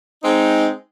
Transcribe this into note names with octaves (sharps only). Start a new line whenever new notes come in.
G#3 C4 D#4